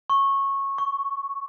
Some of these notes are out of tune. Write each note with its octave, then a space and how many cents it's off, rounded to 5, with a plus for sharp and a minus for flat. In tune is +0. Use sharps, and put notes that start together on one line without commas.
C#6 -15
C#6 +10